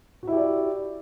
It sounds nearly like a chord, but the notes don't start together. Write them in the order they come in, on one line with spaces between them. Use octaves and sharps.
F#4 E4 G4 D5